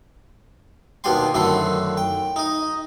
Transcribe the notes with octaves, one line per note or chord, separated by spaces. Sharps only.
D#2 B2 D4 G5 G#5 C6
F#2 D3 D#3 A3 E4 C6
G5
D#4 D#5